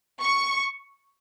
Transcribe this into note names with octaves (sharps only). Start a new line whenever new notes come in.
C#6